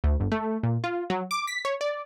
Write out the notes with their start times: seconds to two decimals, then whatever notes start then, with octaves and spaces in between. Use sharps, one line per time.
0.04 D2
0.20 G1
0.32 A3
0.63 A#2
0.84 F4
1.10 F#3
1.31 D6
1.47 B6
1.65 C#5
1.81 D5